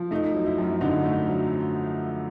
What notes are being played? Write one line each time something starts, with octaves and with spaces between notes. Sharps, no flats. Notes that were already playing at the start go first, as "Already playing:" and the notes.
Already playing: F3
A3 D#4
F#3
E4
F#2
D3 D#4
A3
F#3